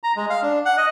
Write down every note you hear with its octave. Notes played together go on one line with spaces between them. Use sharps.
A#5
G#3
F5
D4
F#5
D#5